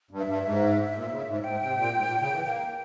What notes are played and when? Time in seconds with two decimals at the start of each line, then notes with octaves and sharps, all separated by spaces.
0.11 G2
0.19 E5
0.27 G2
0.44 G#2
0.95 A#2
1.11 C#3
1.27 G#2
1.44 G#2 G5
1.62 C3
1.78 A#2
1.95 G#2
2.07 A#2
2.20 C#3
2.32 E3
2.45 A#3 G5